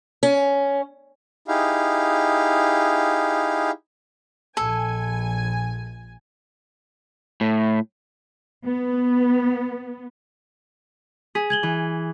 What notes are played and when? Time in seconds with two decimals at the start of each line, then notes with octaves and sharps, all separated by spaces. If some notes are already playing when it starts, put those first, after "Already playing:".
0.23 C#4
1.48 D#4 E4 G4 G#4 F5
4.57 A#1 A4 G#5
7.41 A2
8.67 B3
11.35 G#4 B6
11.50 G#6 F#7 G7
11.63 E3